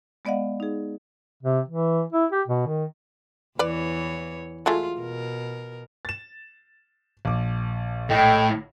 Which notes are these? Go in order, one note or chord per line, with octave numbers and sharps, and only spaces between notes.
G#3 B3 D5 D#5 F5 F#5
D#4 G#4
C3
E3
E4
G4
B2
D#3
E2 E3 B4 C#5 D5
F#3 G#3 A3 F4
B2 A#4
A6 E7
A#1 D6
A2 A4 D#5 G5